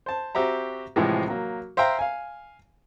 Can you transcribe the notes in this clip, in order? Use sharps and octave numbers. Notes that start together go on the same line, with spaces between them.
C5 A5
C4 F#4 G4 E5 A#5
A2 C3 E3 F3 G#3
F#3 A#3
C5 E5 F5 G5 A#5
F5 G#5